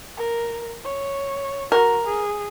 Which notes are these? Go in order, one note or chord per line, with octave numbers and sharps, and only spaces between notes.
A#4
C#5
F#4 A#4
G#4